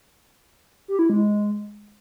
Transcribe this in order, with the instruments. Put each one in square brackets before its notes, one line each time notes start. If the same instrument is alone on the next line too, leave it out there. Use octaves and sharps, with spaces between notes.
[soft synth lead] G4
E4
G#3